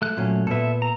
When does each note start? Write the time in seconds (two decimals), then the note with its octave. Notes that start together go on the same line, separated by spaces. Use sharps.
0.02 A3 F#6
0.17 A#2 F#3 C#4
0.47 A#2 B3 A4 E5
0.82 A#5